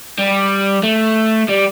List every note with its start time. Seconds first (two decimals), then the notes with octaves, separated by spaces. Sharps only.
0.19 G3
0.83 A3
1.49 G3